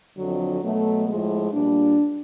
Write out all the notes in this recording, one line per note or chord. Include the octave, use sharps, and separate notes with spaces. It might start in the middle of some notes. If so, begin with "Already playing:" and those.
F2 D3 F#3
B2 F#3 A3
A2 F3 G#3
A#2 G3 D4